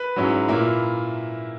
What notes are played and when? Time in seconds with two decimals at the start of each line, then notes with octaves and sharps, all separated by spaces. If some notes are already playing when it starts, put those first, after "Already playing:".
Already playing: B4
0.16 G#2 F#3 C#4 E4
0.48 A#2 A#3 E4